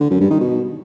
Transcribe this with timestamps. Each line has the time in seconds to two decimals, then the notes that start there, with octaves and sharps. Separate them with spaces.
0.01 D3
0.11 F#2
0.21 G2
0.31 D#3
0.41 B2